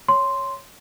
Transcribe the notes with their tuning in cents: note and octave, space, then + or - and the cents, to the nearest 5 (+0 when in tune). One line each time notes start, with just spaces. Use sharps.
C#5 +0 C6 +0